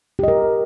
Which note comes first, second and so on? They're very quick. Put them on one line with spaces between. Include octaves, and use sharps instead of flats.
G4 D#5 A#4